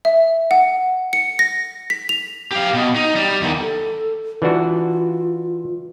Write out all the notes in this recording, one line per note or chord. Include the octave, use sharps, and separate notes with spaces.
E5
F#5
C#7
A#6
B6
F7
G4 F5
B2
D#4
G3
E2 D#3
A4
E3 D4 F4 F#4